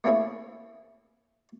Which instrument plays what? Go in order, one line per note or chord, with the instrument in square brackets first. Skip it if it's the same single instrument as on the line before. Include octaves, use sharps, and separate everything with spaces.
[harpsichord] A3 A#3 C4 C#4 E4 G#4